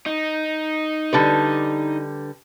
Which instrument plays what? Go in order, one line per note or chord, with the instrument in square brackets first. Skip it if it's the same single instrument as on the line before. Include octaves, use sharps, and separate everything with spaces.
[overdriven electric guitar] D#4
[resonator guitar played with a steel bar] D3 G3 B4